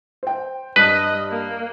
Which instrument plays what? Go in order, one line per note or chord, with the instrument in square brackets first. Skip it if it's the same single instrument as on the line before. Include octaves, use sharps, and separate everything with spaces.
[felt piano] C5 G5
[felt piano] G2 F#6 [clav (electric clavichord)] B4 [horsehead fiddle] D#5
[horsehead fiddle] A#3